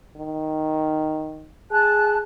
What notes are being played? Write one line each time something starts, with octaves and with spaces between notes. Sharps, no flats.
D#3
G#4 A5 F#6